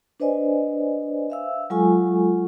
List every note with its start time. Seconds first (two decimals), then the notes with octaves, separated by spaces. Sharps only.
0.20 D4 B4 C5 D5 D#5 G#5
1.30 E5 F5 E6
1.70 F#3 G#3 F4 A4 G#5 C#6